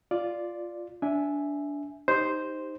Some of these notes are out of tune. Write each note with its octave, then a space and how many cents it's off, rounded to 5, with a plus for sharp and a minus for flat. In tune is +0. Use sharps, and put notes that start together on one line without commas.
F4 +0 D5 +0
D4 -20 E5 +0 G#5 +0
D#4 +0 G4 +0 C5 +0